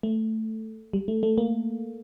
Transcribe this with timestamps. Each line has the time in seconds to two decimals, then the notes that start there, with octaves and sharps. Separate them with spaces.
0.03 A3
0.93 G3
1.08 A3
1.23 A3
1.38 A#3